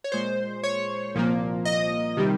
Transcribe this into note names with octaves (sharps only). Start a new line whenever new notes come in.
C#5
A#2 G#3 C5
C#5
C2 A#2 F3 A#3
D#5
C3 D#3 G3